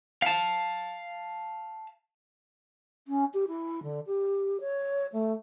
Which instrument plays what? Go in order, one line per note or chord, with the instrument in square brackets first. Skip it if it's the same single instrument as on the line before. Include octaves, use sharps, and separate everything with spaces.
[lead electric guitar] F5 A5
[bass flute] C#4
G4
E4
D3
G4
C#5
A3